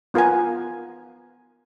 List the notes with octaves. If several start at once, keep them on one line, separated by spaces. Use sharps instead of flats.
B3 F4 A#4 F#5 G#5